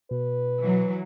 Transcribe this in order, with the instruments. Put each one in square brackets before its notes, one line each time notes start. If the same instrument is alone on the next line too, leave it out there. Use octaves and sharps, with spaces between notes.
[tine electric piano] B2 [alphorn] B4
[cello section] E3 F#3